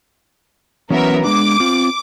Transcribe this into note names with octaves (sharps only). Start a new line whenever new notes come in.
E3 F#3 B3 C#4 A#4 E5
G#3 D4 D6
C4 F4